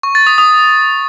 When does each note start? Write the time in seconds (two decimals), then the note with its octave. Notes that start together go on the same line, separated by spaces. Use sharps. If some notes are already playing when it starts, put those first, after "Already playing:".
0.03 C#6
0.15 A6
0.27 D#6
0.38 D#6